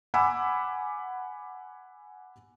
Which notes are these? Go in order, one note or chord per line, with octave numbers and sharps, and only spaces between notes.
F#5 G#5 B5 D6 E6